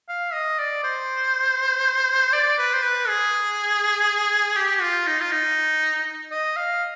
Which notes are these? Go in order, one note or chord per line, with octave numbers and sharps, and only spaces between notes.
F5
D#5
D5
C5
D5
B4
C5
B4
G#4
G4
F4
D#4
F4
D#4
D#5
F5